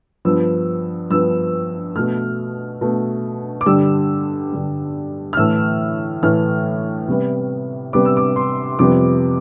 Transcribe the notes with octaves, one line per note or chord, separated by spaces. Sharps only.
G2 F3 B3 E6
G2 F3 B3 E6
B2 A3 F6
B2 A3
D6
G2 D3 G3 E6
G2 D3 G3
F6
A2 E3 A3 E6
A2 E3 A3 F6
C3 G3 B3
C3 G3 B3 D6
E6
D6
C6
F2 C3 G3 B3 D6